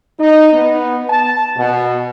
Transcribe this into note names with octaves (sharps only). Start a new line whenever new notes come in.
D#4
B3
A5
B2